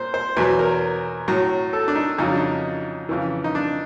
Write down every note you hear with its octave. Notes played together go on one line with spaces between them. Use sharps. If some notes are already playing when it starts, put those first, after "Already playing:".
Already playing: A#2 C5
C5
E2 B2 F#3 B4
A#4
A2 F#3
A4
D4
D#4
F2 C#3 F#3 D#4
D4
D#4
F2 C#3 E3
D#4
D4